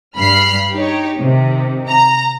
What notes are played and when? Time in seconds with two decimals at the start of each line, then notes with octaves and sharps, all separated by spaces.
0.17 G2 B5 F6 C7
0.74 D#4 G4 C#5
1.20 C3 D#3
1.89 A#5